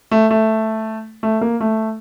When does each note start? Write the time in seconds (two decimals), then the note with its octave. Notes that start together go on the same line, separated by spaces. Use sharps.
0.12 A3
0.31 A3
1.23 A3
1.41 A#3
1.61 A3